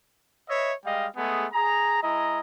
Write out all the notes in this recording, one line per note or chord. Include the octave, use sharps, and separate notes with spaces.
B4 C#5 D#5 E5
G3 G#3 D#5 F5 G5
G#3 A3 B3 G#4
G#4 A#5
G#3 E4 D#5 A#5